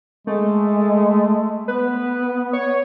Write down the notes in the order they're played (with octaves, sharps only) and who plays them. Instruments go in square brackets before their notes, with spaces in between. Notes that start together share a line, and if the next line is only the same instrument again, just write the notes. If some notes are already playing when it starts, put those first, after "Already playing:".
[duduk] G#3 [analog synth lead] A3
[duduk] B3 [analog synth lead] B4
[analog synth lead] C#5